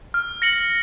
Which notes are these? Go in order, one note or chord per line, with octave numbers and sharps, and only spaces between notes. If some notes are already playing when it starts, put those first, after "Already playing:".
F6
A#6 C#7 F#7